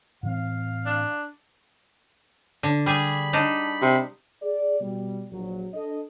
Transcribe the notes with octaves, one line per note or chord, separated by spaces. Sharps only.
A2 E3 C4 F5
D4
D3
G3 G#4 B5
D4 D#4
C3
G#4 D5
B2 G3
A#1 F#3
D4 A4 D#5